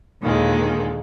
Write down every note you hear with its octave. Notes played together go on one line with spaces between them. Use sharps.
D#2 A#2 D3 D#3 G#3